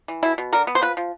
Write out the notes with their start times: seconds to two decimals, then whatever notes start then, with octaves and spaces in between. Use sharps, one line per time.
0.08 E3
0.23 B2 E4
0.38 B2
0.53 D3 A#4
0.67 B3
0.75 C5
0.82 F3 B4
0.97 F3